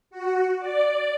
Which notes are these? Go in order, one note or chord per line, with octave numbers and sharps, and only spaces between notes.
F#4
D5